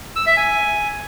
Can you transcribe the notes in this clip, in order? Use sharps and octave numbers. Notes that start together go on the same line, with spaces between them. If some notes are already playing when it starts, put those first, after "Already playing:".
E6
E5
G#5